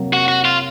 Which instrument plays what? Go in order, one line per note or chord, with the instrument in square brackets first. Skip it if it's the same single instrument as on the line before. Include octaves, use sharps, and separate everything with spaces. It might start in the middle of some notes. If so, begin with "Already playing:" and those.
Already playing: [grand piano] C3 F#3 A#3
[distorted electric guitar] F#4
F#4
F4